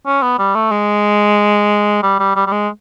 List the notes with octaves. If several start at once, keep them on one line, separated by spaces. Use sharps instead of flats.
C#4
B3
G3
A3
G#3
G3
G3
G3
G3
G#3